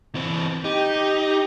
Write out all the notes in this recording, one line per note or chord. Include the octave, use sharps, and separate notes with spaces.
E3 C4
D#4 G4